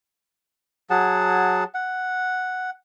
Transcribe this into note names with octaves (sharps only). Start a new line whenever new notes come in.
F#3 G#4 F#5 A5
F#5